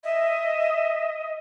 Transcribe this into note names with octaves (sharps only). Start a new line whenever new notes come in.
D#5 E5